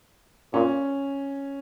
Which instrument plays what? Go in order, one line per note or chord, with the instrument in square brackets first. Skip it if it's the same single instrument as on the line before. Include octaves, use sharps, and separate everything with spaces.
[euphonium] A#2 [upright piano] C#4